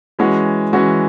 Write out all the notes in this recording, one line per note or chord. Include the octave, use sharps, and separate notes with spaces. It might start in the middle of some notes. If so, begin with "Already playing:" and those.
E3 G#3 C#4 F#4
E3 G#3 C#4 F#4